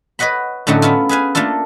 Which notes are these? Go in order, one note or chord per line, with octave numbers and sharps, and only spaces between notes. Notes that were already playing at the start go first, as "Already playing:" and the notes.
B4 C#5 D#5 F#5 B5
A2 D3 F#3 A3 C#4 D#4
B3 C#4 E4 F4
G#4 B4 F5 G#5
A3 A#3 D4 F4 A4